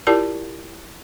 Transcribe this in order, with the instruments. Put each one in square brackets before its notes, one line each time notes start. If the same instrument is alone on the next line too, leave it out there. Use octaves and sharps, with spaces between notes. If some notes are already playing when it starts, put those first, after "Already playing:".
[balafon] E4 F4 G4 A#4 D5 A5